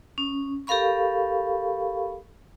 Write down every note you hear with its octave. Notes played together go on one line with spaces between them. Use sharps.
C#4
G4 A4 A#4 F5 B5 C#6